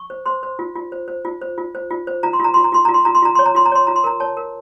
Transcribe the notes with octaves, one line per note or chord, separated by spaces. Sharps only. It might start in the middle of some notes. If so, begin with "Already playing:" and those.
Already playing: C#6
C5
C5 C6
C5
F4
F4
C5
C5
F4
C5
F4
C5
F4
C5
F4 A#5
C6
F4 A#5
F4 C6
A#5
F4 C6
F4 A#5
C6
F4 A#5
C6
F4 A#5
C#5 C6
A#5
F4 C6
A#5
C#5 C6
F4 A#5
C6
A#4 A#5
C#5 A5
A#4